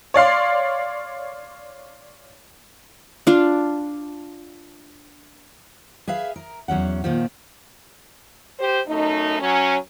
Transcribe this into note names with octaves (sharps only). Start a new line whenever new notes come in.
C#5 D5 F5 C6
D4 F4
G#4 B4 E5 F5
A#4
E2 F#3 C#4 F#5
A#2 D#3 F3
G4 C5
F#2 A3 D#4
F#3 C#4